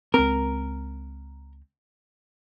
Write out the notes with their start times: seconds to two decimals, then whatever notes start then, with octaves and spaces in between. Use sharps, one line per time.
0.14 C#2 C4 A#4